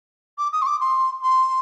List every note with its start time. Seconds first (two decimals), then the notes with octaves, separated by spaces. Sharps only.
0.38 D6
0.52 D#6
0.62 C6
0.66 D6
0.80 C6
1.23 C6